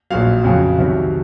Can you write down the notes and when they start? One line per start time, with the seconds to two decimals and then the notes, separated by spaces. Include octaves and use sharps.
0.10 A#1 A#2 F#3 F5
0.44 F2 C#3 F#3
0.78 C2 C3 D#3 F#3